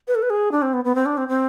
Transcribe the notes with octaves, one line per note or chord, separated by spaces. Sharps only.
B4
A4
B4
G#4
D4
C4
B3
B3
C4
D4
C4
C4